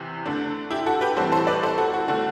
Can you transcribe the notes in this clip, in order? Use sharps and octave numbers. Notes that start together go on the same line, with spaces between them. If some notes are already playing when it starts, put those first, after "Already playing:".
Already playing: E2 C3 E3
D3 A3 D4
E4 G4
F#4 A4
G4 B4
A2 E3 G3 C4 A4 C5
A4 C5
B4 D5
A4 C5
F#4 A4
F#4
D3 A3 D4 F#4